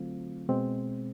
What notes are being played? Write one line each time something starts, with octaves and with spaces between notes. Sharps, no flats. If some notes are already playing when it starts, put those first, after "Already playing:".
Already playing: D3 F#3 A3 C4 F4
B2 G#3 C4